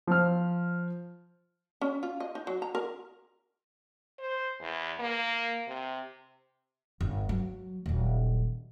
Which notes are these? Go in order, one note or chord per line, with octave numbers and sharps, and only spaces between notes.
F3 F6
C#4
F4
D#5
D#4
F#3
A#5
A#4
C5
E2
A#3
C3
G1
F#3
D#1 F#3